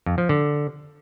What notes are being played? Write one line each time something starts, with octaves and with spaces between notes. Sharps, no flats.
F2
F3
D3